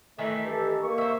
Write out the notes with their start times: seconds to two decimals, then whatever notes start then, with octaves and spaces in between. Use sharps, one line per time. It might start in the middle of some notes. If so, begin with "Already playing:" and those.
0.19 D#3 E3 A3 D#4 E5
0.45 G2 G4 A4
0.82 A#3 C#6
0.98 C5 E5